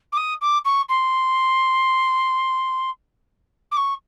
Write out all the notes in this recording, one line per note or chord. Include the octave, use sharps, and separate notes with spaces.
D6
D#6
D6
C#6
C6
D6
C#6